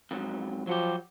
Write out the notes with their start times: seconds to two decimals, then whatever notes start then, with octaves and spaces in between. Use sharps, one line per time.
0.11 F2 G#2 F#3
0.67 F3 F#3 F#4 G4